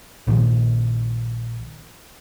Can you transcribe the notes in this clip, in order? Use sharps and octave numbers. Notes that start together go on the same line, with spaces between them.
A#1 A#2 D#3 F3